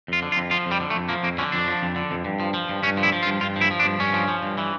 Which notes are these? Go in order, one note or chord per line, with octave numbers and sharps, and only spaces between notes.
F2 F4
D3
F4
F2
F3 F4
F2
G3
D3
A3
F2
F3 A#3
F2 A#3
D3 C#4
F2 D4
F3
F2
D3
F2
G2
F3
F3
G2
G2 C#4
F3
E4
F3
F4
G2
G2 F4
F3
E4
F3
D4
G2
G2 C#4
F3
F3
G2
E3